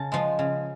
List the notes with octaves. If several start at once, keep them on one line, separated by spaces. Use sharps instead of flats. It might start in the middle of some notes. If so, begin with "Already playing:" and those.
Already playing: C#3 A5
F3 G#3
C#3